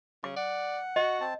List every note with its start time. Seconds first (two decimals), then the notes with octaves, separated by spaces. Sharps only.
0.24 C#3 D6
0.36 D5 F#5
0.96 F#4 D#5
1.20 C4 A5